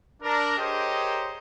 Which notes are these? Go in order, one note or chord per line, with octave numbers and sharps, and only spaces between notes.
D4 A#4
G4 G#4 A#4 C5 C#5 D#5